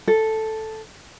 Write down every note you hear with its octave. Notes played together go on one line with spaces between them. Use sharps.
A4